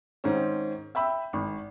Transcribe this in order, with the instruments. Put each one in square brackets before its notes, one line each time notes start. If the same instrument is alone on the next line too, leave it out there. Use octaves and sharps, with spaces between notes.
[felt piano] G#2 D#3 C4 C#4
E5 G5 B5 E6
G#1